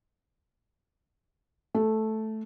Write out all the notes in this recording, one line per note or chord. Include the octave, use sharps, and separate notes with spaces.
A3